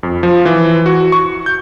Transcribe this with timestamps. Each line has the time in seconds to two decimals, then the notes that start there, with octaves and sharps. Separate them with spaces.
0.03 F2
0.23 F3
0.45 E3
0.86 F#4
1.12 C#6
1.46 G6